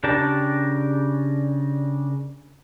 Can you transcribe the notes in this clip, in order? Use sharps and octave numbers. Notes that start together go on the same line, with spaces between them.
C#3 D4 G4 A#4 A5